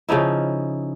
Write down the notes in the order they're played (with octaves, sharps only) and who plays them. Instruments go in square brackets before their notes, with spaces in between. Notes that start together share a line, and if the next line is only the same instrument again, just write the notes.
[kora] C#3 F3 D#4 E4